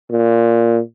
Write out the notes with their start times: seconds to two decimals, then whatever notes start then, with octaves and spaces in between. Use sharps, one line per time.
0.10 A#2